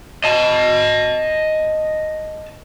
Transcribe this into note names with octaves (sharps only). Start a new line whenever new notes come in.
D#5 A5